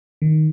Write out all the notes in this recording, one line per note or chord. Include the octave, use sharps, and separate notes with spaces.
D#3